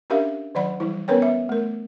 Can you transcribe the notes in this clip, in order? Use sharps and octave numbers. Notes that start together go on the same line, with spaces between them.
C#4 D4 G4 A#4 E5 F5
D#3 F#3 D5 F#5 B5
E3 G3 E4
B3 C#4 A#4 B4 C#5 G5
E5
A3 A#4